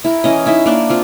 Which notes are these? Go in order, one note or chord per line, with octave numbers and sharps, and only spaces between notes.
E4 A#4
E3 C#4 D#5
D#4 E4 E5
A#3 D4
C4 F4